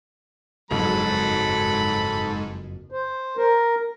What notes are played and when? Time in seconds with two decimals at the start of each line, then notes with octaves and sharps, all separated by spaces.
0.71 F#1 F2 G#2 F#3 A4 B5
2.91 C5
3.37 A#4